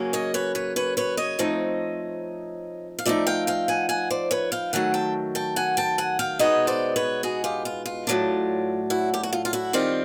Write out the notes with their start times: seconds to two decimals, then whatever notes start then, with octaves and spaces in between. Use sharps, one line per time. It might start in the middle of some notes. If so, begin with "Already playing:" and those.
Already playing: C#3 F#3 A#3 C#4
0.13 C#5 D#5
0.34 B4 C#5
0.55 B4 C#5
0.76 B4 C#5
0.97 B4 C#5
1.17 C#5 D#5
1.39 F3 A3 C4 D#4
2.99 F5
3.06 F3 A3 C4 D#4 D5 E5
3.27 F5 G5
3.47 F5 G5
3.68 F#5 G#5
3.89 F#5 G#5
4.11 C5 D5
4.31 B4 C#5
4.52 F5 G5
4.73 D#3 F#3 A3 F#5 G#5
4.94 G5 A5
5.35 G5 A5
5.56 F#5 G#5
5.77 G5 A5
5.98 F#5 G#5
6.19 F5 G5
6.39 B2 G#3 B3 D#4 C#5 D#5
6.67 C5 D5
6.96 B4 C#5
7.23 F#4 G#4
7.44 F4 G4
7.65 F4
7.86 F4
8.07 A2 F#3 A3 D4
8.90 E4 F#4
9.14 G4
9.23 F#4
9.33 F4
9.45 F4
9.53 E4 F#4
9.73 D#3 G3 C4 F4 G4